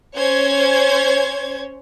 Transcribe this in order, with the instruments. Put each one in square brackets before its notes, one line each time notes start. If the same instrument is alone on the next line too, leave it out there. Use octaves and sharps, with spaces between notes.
[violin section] C#4 C5 C#5 G#6